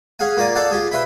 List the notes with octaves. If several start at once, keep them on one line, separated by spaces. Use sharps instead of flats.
C#4 G#4 F5 F#5 G#5
A#3 F4 A#4 D5 G#5
A4 C5 D5 F5 F#5 A5
F4 G4 G#4
B4 C5 E5 G5 B5